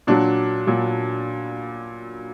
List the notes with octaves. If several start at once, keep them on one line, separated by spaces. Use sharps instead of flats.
A#2 F#3 D4
A#2 F#3